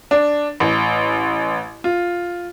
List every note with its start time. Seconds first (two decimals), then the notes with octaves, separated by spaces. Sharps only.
0.11 D4
0.60 A1
1.84 F4